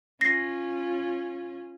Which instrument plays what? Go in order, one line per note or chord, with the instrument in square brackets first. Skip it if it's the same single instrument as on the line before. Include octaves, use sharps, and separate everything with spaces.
[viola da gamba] C#4 F4 [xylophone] A#6 C7